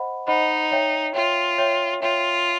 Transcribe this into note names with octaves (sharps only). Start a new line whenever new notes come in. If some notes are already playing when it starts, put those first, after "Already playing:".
Already playing: C5 D#5 F#5 B5
D#4 C5 D#5 F#5 B5
C#5 E5 G5
F4 C#5 E5 G5
C#5 E5 G5
F4 C#5 E5 G5